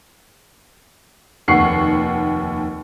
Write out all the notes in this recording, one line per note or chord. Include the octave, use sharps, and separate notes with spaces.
F1 D#2 F#5 C#6 C7